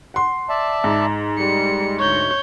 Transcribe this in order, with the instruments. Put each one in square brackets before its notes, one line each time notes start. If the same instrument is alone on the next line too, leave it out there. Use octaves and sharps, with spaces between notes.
[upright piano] F#5 C6
[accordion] D5 E5 A5
[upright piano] G#2
[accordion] G3 [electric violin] C#7
[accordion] D2 C#6 [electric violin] C#5 G6